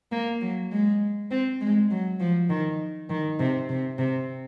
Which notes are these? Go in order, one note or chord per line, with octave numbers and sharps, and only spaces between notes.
A#3
F#3
G#3
C4
G#3
F#3
F3
D#3
D#3
C3
C3
C3